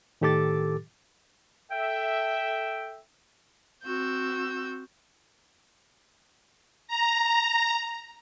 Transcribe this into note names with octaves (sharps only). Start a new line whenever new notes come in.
A2 D#3 G4 A4 D6 A6
A4 E5 G5
C4 F#4 E6 G6
A#5